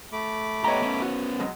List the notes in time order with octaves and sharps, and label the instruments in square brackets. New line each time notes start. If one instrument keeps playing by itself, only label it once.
[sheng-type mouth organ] A3 B5 D6
[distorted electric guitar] B3 G4 [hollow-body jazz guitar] C#5 D#5 A#5
[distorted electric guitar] B3 C#4
[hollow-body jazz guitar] F#4
B2 F#3 G#3